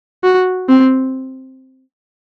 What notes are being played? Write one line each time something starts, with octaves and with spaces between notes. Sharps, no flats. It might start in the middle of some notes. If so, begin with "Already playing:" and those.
F#4
C4